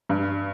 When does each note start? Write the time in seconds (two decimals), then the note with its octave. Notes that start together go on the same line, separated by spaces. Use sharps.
0.09 G2